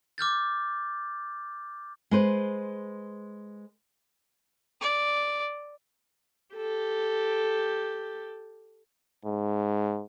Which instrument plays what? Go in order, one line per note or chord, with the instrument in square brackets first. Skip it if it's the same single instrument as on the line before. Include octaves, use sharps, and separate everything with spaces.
[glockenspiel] D6 F6 G6 A6
[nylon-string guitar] G#3 B4 C5
[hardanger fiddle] D5
[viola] G4 A4
[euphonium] G#2